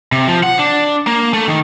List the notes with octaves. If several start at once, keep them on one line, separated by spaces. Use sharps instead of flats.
C3
F3
F#5
D4
A#3
A3
D#3